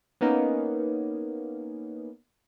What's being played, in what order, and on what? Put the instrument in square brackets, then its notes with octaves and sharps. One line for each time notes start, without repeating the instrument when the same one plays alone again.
[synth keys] A#3 B3 C#4 D#4